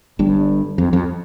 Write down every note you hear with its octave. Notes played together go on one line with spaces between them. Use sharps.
G1 G2
F2
F2